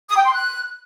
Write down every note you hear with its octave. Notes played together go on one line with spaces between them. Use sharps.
D#6
G5
C6
F#6